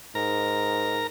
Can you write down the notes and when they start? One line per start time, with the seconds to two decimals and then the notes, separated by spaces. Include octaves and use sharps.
0.15 G#2 A#4 A#5